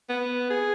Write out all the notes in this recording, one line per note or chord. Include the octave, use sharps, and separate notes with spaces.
B3
G#4